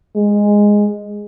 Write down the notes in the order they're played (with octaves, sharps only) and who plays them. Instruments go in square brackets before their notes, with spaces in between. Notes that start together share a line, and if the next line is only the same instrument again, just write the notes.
[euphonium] G#3